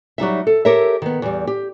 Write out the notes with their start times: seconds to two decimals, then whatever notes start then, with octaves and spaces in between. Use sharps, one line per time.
0.18 F#3 G3 D#4 E5
0.47 A4
0.65 G4 A4 A#4 C#5 E5
1.02 D#3 B3
1.22 E2 G3
1.47 G4